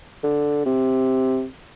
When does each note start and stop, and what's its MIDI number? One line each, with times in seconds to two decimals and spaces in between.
0.24 0.64 50
0.66 1.44 48